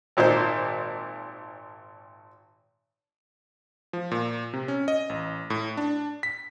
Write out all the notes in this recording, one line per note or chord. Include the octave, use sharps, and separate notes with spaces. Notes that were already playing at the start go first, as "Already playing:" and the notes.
G#1 A#2 D#4 C5
F3
A#2
C3
C#4
D#5
A1
A2
D4
B6